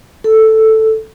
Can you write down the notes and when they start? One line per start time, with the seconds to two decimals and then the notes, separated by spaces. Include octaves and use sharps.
0.24 A4